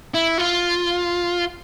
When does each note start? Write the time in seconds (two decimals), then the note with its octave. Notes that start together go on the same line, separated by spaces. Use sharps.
0.14 E4
0.38 F4